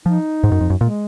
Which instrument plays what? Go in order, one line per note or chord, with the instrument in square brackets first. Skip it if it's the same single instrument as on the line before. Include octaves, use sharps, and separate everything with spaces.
[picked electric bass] F3 [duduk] D#4
[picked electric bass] G#2
F#2
F2
F#2
[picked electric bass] A#2 [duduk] G#3